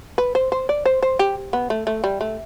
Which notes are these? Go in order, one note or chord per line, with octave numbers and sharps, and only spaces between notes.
B4
C5
C5
D5
C5
C5
G4
B3
A3
A3
G3
A3